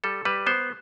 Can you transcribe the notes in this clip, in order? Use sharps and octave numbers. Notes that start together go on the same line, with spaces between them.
G3 A4
G3 B4
B3 C5